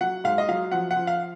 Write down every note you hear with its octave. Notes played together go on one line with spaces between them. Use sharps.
F#3 F#5
G#2 F5
D#5
F#3 F5
F3 F#5
F#5
F3
F5